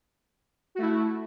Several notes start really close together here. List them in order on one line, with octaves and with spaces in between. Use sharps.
F#4 A3 E4